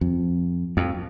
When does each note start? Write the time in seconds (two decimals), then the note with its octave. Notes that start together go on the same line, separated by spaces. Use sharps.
0.01 F2
0.77 F2